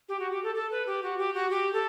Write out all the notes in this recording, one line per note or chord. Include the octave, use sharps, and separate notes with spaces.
G4
F#4
G4
A4
A4
B4
G4
F#4
G4
F#4
G4
A4